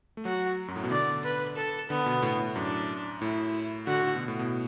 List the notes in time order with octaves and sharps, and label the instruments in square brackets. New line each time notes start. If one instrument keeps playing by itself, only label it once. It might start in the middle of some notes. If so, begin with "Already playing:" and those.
[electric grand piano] A3
[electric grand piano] F#3 [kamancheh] F#4
[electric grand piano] F#2
A2
B2
[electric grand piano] D3 [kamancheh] D5
[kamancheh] B4
A4
[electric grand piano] D3 [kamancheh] B3
[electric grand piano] B2
A2
A2
[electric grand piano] F#2 [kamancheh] D4
[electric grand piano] A2 [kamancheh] E4
[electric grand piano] D3 [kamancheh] F#4
[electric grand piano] D3
B2
A2
B2